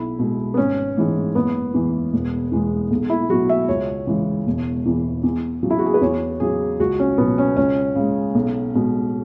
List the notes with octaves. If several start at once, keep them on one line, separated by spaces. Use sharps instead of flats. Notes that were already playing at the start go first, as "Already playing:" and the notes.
Already playing: B1 E4
B2 G#3
B3
G#1 C#4
G#2 E3 G#3
F#1 B3
E2 E3
E1
E2 E3 G#3
B1
E4
B2 F#3 F#4
E5
C#2 C#5
C#3 E3 G#3
E1
E2 E3
E2
C#3 F#3
E4
F#4
G#4
B4
E2 C#5
C#3 F#3 G#4
C#2 F#4
C#4
B2 F#3 B3
C#4
C#2 C#4
C#3 G#3
B1
B2 G#3